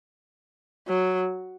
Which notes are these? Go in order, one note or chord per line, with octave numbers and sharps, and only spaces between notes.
F#3